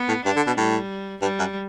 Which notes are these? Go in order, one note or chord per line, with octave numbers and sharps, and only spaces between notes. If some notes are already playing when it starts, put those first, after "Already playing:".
Already playing: B3
A2
G2 D4
D3
B2
A2 G3
G2 G3
F#2